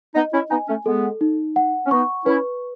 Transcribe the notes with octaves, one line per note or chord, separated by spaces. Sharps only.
B3 D#4 D#5
C#4 E4
B3 D#4 G#5
A3 C#4
G#3 B3 A4
D#4
F#5
C#4
B3 D#4 C#6
C#4 E4 B4